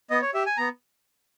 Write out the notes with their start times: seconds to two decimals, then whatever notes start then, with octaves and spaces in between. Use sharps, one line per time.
0.10 B3 D#5
0.22 C#5
0.34 G4 E5
0.46 G#5
0.57 B3 A#5